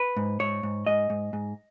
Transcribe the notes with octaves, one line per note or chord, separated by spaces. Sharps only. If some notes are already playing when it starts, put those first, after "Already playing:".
Already playing: B4
G#2
G#2 C#5
G#2
G#2 D#5
G#2
G#2